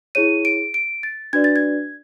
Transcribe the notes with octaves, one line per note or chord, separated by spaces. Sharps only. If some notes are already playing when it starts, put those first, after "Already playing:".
E4 G#4 C#5 D#7
D7
D7
A6
D4 F#4 B4 D5 G#6
A6
G#6